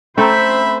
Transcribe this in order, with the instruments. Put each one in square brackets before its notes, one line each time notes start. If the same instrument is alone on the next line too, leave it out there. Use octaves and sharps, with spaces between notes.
[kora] A3 C4 A4 [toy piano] C#4 A#5 [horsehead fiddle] C5 [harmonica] E5 B5